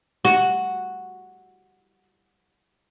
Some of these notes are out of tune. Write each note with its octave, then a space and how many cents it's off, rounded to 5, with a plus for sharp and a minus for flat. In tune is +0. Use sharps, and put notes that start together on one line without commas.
F#4 -5